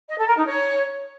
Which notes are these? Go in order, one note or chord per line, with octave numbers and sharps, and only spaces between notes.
D#5
A4
A#4
D#4
C#5